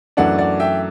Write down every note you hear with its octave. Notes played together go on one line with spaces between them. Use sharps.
F#2 E3 A3 D4 D5 F#5
D5 F#5
E5 G5